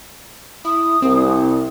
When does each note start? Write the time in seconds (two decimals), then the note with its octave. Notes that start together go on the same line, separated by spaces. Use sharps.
0.65 E4 D#6
1.02 C2 C4